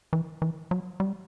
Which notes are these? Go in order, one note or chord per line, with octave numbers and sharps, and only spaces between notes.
E3
E3
F#3
G3